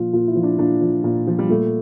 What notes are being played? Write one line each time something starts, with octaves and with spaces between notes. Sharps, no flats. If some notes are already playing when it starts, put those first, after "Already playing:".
Already playing: A#2 F3 F4
A#2 F4
E4
F3
D4
A#2 D4
F3
A#2
F3
G3
A#2 A3